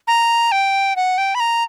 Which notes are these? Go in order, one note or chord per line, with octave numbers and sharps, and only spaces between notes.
A#5
G5
F#5
G5
B5
A#5